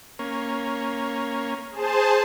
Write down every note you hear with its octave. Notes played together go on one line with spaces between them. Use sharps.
A#3 C#4
G#4 C5 A5